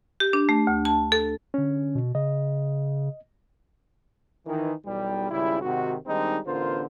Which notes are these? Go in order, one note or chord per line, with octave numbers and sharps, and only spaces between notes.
G4
D4
A3
D2
A5
A4
D3 C#4
B2
C#3 D#5
D#3 E3
B1 E2 G3
G#1 C#2 C#3 G3 E4
G#2 C3 D#3 F#4
D#3 G3 G#3 C4 D4 D#4
A1 D3 B3 F4 A#4 C5